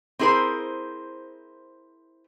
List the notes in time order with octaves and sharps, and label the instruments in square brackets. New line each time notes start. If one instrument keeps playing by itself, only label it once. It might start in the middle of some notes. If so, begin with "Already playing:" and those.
[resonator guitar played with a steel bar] C4 E4 G#4 A#4 C5